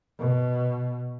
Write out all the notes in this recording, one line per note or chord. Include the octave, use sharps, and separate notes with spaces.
B2